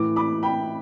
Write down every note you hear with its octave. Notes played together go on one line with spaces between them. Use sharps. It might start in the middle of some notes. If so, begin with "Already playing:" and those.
Already playing: A2 E3 D6
B5 D6
G5 B5